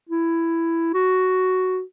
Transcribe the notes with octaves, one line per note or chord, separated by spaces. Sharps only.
E4
F#4